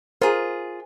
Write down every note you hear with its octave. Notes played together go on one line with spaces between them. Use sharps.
F4 G#4 A#4 C5